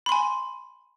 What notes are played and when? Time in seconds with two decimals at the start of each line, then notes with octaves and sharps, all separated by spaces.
0.06 B5
0.09 C6
0.12 G#5